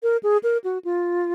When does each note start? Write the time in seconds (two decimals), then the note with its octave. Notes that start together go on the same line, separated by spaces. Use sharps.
0.03 A#4
0.23 G#4
0.43 A#4
0.64 F#4
0.85 F4